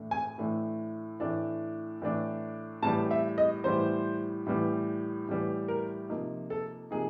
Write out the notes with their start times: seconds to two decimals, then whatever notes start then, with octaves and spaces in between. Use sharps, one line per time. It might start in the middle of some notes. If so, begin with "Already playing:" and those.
Already playing: A2 E3 A3 D4
0.11 G#5
0.38 A2 E3 A3 D4
1.20 A2 E3 A3 D4
2.02 A2 E3 A3 D4
2.83 A2 E3 G3 B3 A5
3.11 E5
3.38 D#5
3.64 A2 E3 G3 B3 C5
4.46 A2 E3 G3 B3
5.29 A2 E3 G3 B3
5.68 A#4
6.09 C3 F3 A#3 D#4
6.50 A4
6.91 C3 F3 A#3 D#4 G#4